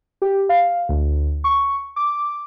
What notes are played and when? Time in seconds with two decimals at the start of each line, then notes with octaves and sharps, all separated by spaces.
0.22 G4
0.49 F5
0.89 D2
1.44 C#6
1.96 D6